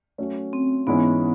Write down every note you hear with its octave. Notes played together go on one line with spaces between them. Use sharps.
F#3 A3 C#4
C4
G#2 E3 G#3 B3 C#4 E4